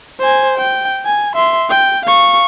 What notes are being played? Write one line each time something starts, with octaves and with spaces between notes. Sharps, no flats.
C5 G#5
G5
G#5
E5 C6
G5
F5 C#6